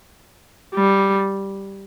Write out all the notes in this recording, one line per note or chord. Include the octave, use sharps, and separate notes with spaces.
G3